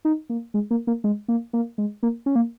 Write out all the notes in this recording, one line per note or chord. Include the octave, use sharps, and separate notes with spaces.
D#4
A#3
G#3
A#3
A#3
G#3
A#3
A#3
G#3
A#3
C#4
A#3